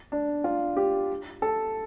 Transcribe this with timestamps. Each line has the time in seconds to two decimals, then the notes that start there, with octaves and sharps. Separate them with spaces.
0.12 D4
0.44 F4
0.77 G4
1.42 A4